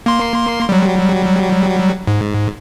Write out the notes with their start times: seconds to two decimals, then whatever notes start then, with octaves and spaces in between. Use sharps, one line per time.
0.06 A#3 C6
0.69 F#3 G3
2.07 G#2